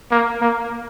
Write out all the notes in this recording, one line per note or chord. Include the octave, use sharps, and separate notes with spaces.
A#3
A#3